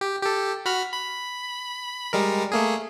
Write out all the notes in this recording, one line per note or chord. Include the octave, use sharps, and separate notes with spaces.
G4
G4 A4
F#4 B5 F6
B5
G3 G#3 A#4
A3 A#3 G#4